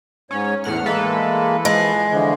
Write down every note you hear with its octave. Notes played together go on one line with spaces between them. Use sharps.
G#2 C#4 C#5
E2 A2 F#5 F6
E3 G#3 A#3 A4 B4
F3 G#3
D3 E3 F3